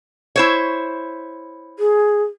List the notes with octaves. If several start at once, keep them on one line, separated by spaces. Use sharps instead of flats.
E4 C5 C#5
G#4